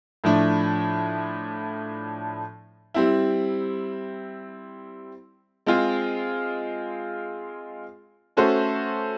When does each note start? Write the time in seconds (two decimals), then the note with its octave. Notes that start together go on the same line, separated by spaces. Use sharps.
0.24 A2 F3 A3 D4
2.94 G3 C4 E4
5.66 G#3 C4 F4 G#4
8.37 A3 C#4 F#4 A4 C5